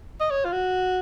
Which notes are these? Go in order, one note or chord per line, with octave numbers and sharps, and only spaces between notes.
D#5
C#5
F4
F#4